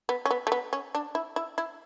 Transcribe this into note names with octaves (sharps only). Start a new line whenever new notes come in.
B3
C#4
B3
A3
B3
C#4
D4
E4
E4
E4